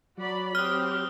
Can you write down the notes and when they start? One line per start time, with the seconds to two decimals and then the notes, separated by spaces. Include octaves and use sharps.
0.17 F#3 F#4 D5 B5
0.55 C4 G4 D#6 F6 F#6 G7